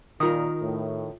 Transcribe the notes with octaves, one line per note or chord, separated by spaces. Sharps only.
A#2 D#3 F4 A#4 D#6
A2